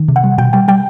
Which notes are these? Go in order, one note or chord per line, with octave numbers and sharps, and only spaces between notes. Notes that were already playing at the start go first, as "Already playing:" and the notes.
Already playing: D#3
C3
F#5
G3
B2 G5
G3 G5
G3 G5